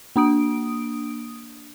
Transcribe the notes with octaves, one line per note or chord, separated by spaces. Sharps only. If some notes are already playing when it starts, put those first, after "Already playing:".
A#3 D4 D#6 D7